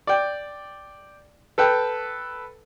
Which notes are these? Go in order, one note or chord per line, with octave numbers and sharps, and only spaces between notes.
D5 G5
A4 B4 G5